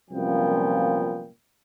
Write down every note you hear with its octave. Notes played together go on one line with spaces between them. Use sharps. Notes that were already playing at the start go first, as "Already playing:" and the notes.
C2 F#2 A#2 F3 B3 G5